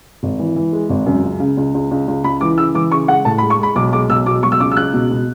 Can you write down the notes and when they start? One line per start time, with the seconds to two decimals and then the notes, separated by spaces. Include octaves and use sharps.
0.23 G#1
0.39 E3
0.56 E3
0.73 G#3
0.90 G#1
1.06 F#2
1.24 C#2
1.40 C#3
1.57 C#2
1.74 C#2
1.91 C#2
2.08 C#2
2.24 C#2 B5
2.41 E3 D6
2.58 C#3 E6
2.74 E3 D6
2.92 C#3 C#6
3.08 G#3 F#5
3.25 A2 A5
3.38 B5
3.43 G#3
3.50 C#6
3.59 G#3 B5
3.76 B1 D6
3.92 G#3 D6
4.09 B1 E6
4.26 B2 D6
4.43 F#3 C#6
4.52 E6
4.60 C#2 D6
4.71 E6
4.77 C#2 F#6
4.94 B2
5.11 B2